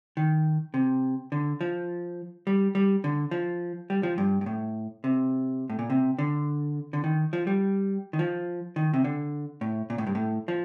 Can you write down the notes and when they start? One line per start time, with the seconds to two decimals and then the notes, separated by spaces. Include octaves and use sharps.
0.17 D#3
0.74 C3
1.32 D3
1.61 F3
2.47 G3
2.75 G3
3.04 D3
3.31 F3
3.90 G3
4.03 F3
4.18 G2
4.41 G2
4.46 A2
5.04 C3
5.70 A2
5.79 A#2
5.90 C3
6.19 D3
6.93 D3
7.04 D#3
7.33 F3
7.47 G3
8.13 D#3
8.19 F3
8.76 D#3
8.94 C3
9.04 D3
9.61 A2
9.90 A#2
9.98 A2
10.07 G2
10.15 A2
10.48 F3